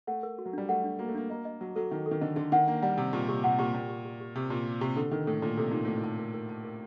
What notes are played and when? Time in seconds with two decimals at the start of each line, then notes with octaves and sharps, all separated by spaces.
0.07 A3 F#5
0.23 A#4
0.39 F#4
0.46 F#3
0.53 G3 D4
0.69 A3 F#5
0.84 D4
0.99 A#3 F#4
1.09 A3
1.15 A#3 D4
1.30 A#3 D#5
1.45 D#5
1.61 F#3 A5
1.76 F#3 A4
1.91 D#3 A5
2.06 A4
2.11 D#3
2.21 D3 D#5
2.36 D3 C6
2.52 D#3 F#5
2.67 A#3 D4
2.82 G3 F#5
2.97 C3 G4
3.13 A#2 G4
3.28 C3 G4
3.43 C3 F#5
3.58 A#2 G4
3.74 A#2 G5
3.89 G4
4.04 G4
4.20 G4
4.36 C3 G4
4.50 A#2 G4
4.66 G4
4.81 C3 G4
4.96 D3 A4
5.11 D#3 A4
5.27 A2 A4
5.42 A#2 A4
5.57 C3 A4
5.71 A#2 D#4
5.85 A2 A5
5.96 A#2
6.04 A5
6.19 A#4
6.34 A#4
6.49 A5
6.64 A#4